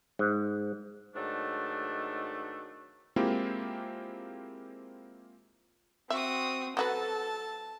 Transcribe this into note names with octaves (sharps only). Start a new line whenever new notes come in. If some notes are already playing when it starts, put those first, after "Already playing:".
G#2
G#2 D#3 F#3 A3 D4
G#3 A#3 C4 E4 F4 G4
C4 F#4 E5 D#6
F#3 F#4 A4 B4 A5